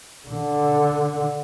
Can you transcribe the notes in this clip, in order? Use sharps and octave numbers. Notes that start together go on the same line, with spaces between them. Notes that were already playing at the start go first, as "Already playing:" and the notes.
D3